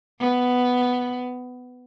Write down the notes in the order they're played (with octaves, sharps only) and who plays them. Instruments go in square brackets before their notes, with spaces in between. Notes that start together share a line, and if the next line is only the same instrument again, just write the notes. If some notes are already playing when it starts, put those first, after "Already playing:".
[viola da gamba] B3